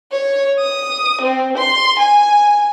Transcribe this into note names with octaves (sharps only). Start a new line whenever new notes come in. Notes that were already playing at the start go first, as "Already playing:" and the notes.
C#5
D#6
C4
C6
G#5